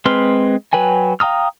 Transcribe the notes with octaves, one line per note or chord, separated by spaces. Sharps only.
G#3 C4 B4 C6 F6
F#3 B4 G5 G#5
F5 G5 A#5 D#6 F6